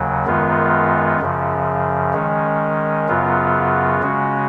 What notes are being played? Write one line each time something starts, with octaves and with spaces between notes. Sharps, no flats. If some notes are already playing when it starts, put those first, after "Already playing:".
Already playing: D#2 C#3 F#3
F#2 D#3 G#3 B3 F4
F#2 C#3 F3
D#3 G#3 C#4
F#2 C#3 F#3 B3 F4
C#3 G#3 C#4 F#4